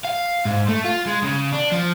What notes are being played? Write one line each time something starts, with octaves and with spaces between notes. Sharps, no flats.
F5
G#2
A3
F4
G#3
C#3
D4
F3